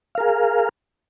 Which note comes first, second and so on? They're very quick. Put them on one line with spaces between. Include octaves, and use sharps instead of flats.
F5 A#4 G#4